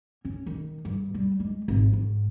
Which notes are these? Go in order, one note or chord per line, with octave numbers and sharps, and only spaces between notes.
C#4
D#3
G2
G3
G#3
G#1
G#2